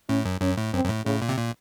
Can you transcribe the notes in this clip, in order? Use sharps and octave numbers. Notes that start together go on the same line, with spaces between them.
A2 C#4
F#2
F#2 C#4
A2
F#2 C4
F#2
A2
A2 C#3
A#2
C3
A#2